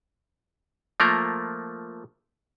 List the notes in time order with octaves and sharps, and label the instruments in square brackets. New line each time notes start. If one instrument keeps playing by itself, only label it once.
[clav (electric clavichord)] F3 A3 A#3 A#4